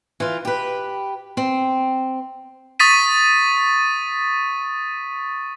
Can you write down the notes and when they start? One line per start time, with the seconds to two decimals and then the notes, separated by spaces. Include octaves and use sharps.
0.20 E3 F4
0.45 G4 B4
1.37 C4
2.80 C#6 D#6 A6 B6 D#7